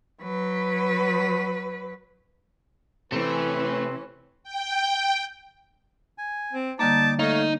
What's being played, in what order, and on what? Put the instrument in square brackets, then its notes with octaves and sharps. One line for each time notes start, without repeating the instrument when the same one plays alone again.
[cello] F#3 B4
[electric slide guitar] C3 C4 [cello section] E3 C#4 [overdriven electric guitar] A3 [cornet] B4
[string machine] G5
[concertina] G#5
[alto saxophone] C4
[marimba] D3 G3 A#3 [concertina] D#4 D6 [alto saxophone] A5
[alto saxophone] A3 [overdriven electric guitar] D#4 [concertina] C#5 F5